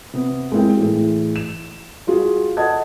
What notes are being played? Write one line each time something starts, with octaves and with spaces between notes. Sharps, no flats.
C3 B3
G#3 A#3 C4 E4 G5
A2 E3 G#4
E7
G3 F4 F#4 G#4
A4 D#5 F#5 A5 G#6